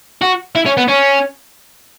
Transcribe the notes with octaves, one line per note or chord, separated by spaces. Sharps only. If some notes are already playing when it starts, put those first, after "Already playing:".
F#4
E4
C#4
B3
C#4